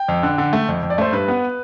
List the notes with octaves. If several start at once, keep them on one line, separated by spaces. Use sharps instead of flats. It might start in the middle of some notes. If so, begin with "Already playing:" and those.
Already playing: G5
F2
D3
D3
A3
F2
F2
D5
A3 C5
G2 B4
B3